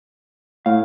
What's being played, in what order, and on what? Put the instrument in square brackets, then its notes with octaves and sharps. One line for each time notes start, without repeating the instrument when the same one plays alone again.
[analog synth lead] A2 [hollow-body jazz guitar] F5